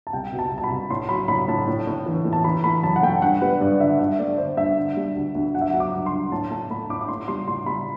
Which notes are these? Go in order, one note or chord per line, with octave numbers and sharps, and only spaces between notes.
A5
C2 G5
B2
A5
C2
A5
B5
C2
A2 C6
F#3 B5
A2 B5
A2 A5
A2
A2
E3
A2
A5
E3 B5
A3 B5
F#2 A5
F#5
A3 G5
G2 F#5
G3 B4
G2 D5
D3 E5
G2 E5
A3 D5
D3 C5
G2 E5
D3
G3
D2
D2
F#3 F#5
E5
F#3 F#5
D6
G2
C6
G2
A2 A5
A3 A5
A3 B5
A2 D6
D6
A2 C6
G3 C6
A2 C6
G3 B5